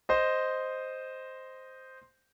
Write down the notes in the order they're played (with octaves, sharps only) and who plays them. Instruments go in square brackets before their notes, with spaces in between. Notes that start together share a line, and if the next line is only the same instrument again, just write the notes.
[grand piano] C5 D#5